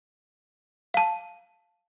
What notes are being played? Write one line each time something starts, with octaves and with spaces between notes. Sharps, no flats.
F5 A5